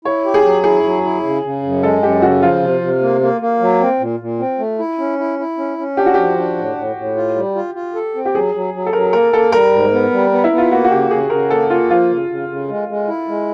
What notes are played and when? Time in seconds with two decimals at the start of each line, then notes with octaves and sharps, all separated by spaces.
0.05 E4 C#5
0.25 G4
0.34 G#4
0.44 F#3
0.64 E4 G#4
0.84 F#3
1.04 E4
1.24 C#3
1.43 C#3
1.63 F#2
1.82 G#3 A4
2.02 F#2 G4
2.22 C#3 F#4
2.42 F3 F4
2.62 C3
2.81 C3
3.01 A#3
3.21 A#3
3.41 A#3
3.60 F#3
3.80 C4
4.00 A#2
4.20 A#2
4.39 C4
4.59 A3
4.79 E4
4.98 C#4
5.18 E4
5.39 E4
5.58 C#4
5.78 C#4
5.97 D4 G4
6.06 F#4
6.14 F3 G4
6.37 D4
6.57 A2
6.76 A2
6.96 A2
7.16 F4
7.36 G3
7.55 F4
7.75 F4
7.95 A4
8.15 C4
8.25 G4
8.35 F#3 G#4
8.54 F#3
8.74 F#3
8.86 A4
8.93 F#3 A#4
9.13 A#3 A#4
9.33 A#3 A4
9.52 G3 A#4
9.73 G#2
9.92 B3
10.12 G3
10.32 B3
10.44 E4
10.52 B3
10.58 F4
10.72 A#3 F#4
10.84 F#4
10.91 C#3 G4
11.11 C#3 G#4
11.30 C#3 A#4
11.50 A#3 A4
11.70 A#3 F4
11.90 F3 F4
12.09 C#3
12.29 C#3
12.49 C#3
12.69 G#3
12.88 G#3
13.08 E4
13.28 G#3